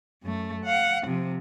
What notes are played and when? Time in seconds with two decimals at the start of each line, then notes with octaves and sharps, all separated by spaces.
0.23 F#2 A3
0.64 F5 F#5
1.06 C3 F3